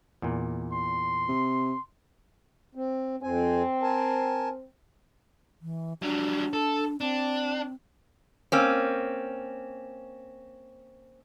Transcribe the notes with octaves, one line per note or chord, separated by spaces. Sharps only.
E2 A#2
C6
C3
C4
F2 C4 G#5
A#4 G#5 A5
E3
F#3 G3 D4
A4
C4 D4
A#3 C4 C#4